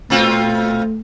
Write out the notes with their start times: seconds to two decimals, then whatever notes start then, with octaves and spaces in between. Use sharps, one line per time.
0.10 A#2 A3 C4 F4